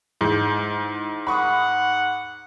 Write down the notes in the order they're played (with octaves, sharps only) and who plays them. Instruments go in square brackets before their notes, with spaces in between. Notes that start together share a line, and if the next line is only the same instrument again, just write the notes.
[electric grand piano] G#2 [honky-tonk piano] E3 G#3 G6
[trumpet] F#5 [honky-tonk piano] B5 C#6 D#6